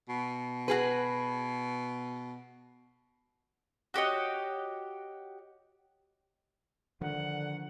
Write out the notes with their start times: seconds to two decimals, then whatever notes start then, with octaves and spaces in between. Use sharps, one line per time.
0.09 B2
0.68 F#4 G#4 B4
3.94 F#4 G4 C#5 D#5
7.01 D3 D#3 F3 F#5